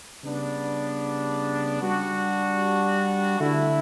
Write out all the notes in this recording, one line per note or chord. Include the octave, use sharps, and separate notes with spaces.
C#3 G3 B3 D4
G3 D4 F#4
D3 A3 E4